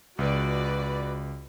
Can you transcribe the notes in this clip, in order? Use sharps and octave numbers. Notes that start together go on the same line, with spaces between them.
C#2 F#4 B4 D5